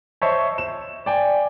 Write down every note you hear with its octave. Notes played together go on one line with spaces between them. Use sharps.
C5 C#5 D#5 E5 A5 C#6
E7
D5 G5 G#5